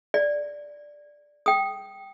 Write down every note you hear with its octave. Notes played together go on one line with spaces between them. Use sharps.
D5
G5 D#6